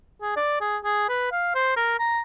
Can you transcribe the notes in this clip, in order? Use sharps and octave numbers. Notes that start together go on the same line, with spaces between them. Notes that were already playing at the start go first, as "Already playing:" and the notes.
G#4
D5
G#4
G#4
B4
F5
C5
A#4
A#5